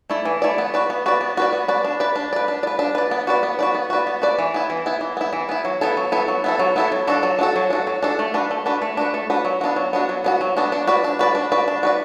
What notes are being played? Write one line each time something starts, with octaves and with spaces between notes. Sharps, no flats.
A3 E4 D5
E3
A3 E4 D5
B3
F#4 B4 D5
B3
F#4 B4 D5
B3
F#4 B4 D5
B3
F#4 B4 D5
D4
B4 D5
D4
B4 D5
D4
D5
B4
D4
B4 D5
B3
F#4 B4 D5
B3
F#4 B4 D5
B3
F#4 B4 D5
B3
F#4 B4 D5
E3
B3 E4
E3
B3 E4
E3
B3 E4
E3
B3 E4
F#3
B3 E4 A4
F#3
B3 E4 A4
F#3
B3 E4 A4
F#3
B3 E4 A4
F#3
D4 F#4 A4
F#3
D4
F#4 A4
F#3
D4 F#4 A4
F#3
D4 F#4 A4
A3
D4 F#4 B4
A3
D4 F#4 B4
A3
D4 F#4 B4
A3
D4 F#4 B4
F#3
B3 D4 F#4
F#3
B3 D4 F#4
F#3
B3 D4 F#4
F#3
B3 D4 F#4
D4
F#4 B4 D5
D4
F#4 B4 D5
D4
F#4 B4 D5
D4
F#4 B4 D5